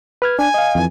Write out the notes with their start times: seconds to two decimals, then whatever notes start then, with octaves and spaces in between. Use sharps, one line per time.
0.22 B4 F6 G#6
0.39 D4 G#5
0.54 D#5 F5
0.75 F2 E3